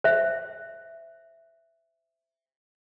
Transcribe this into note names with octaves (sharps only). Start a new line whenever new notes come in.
C5 E5